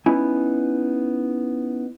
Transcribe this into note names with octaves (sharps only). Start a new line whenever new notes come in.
B3 C#4 D#4 E4 G#5